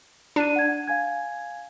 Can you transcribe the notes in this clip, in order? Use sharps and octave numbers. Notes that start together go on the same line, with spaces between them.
D4 D5 D#7
F#5 G#6
F5 G#5 G#6